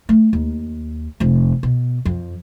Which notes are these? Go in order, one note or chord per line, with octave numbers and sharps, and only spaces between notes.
A3
D#2
F1 F2
B2
F2